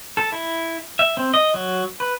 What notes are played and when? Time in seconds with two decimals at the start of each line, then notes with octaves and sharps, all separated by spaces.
0.17 A4
0.32 E4
0.99 E5
1.17 C4
1.34 D#5
1.54 F#3
2.00 B4